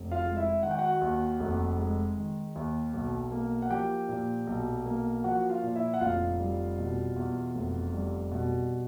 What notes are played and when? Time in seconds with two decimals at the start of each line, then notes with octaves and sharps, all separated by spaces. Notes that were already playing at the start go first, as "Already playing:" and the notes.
Already playing: F1
0.12 F4 F5
0.25 G#3
0.37 E4 E5
0.63 D#3 F#5
0.71 G5
0.78 F#4 F#5
1.01 D#2
1.40 F1
1.78 G#3
2.17 D#3
2.56 D#2
2.93 B1
3.32 A#3
3.62 F#5
3.70 F3 G4 G5
4.09 A#2
4.47 B1
4.86 A#3
5.24 F3 F#4 F#5
5.49 F4 F5
5.63 A#2
5.75 E4 E5
5.94 F#5
6.01 F1 F4 F5
6.40 G3
6.78 B2
7.16 E2
7.55 F1
7.93 G3
8.31 B2